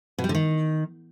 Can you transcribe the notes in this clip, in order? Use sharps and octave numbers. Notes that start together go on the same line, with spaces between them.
B2
G3
D3
D#3